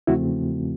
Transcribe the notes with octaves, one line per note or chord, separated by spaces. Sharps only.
E2 C#3 F3 A3 C4 E4 F#4